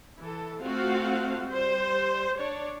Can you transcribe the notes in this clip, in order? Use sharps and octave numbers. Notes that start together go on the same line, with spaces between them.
E3 A4
A3 C4 F4 F#4 F5 F#5
G3 C5
D4 C#5 D5